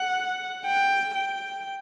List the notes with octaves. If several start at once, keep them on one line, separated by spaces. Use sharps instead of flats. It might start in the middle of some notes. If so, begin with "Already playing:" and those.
Already playing: F#5
G5
G5